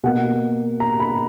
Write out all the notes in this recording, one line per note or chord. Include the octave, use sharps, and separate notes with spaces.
B2 A#3 F#5
A#5
B5